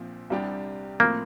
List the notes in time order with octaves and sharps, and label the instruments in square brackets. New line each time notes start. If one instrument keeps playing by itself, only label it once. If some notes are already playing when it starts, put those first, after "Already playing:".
Already playing: [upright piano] A#1 A#2 F3 C4
C2 C3 G3 D4 G4
[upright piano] A2 F3 C4 [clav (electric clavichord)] A#3